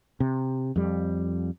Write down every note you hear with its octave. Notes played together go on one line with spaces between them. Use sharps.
C3
F2 G3